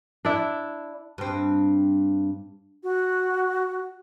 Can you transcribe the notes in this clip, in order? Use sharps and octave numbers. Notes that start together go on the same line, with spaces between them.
D4 E4
G2 C4
F#4